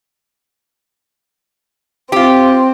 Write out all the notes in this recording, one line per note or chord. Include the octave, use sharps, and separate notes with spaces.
C4 F4 G4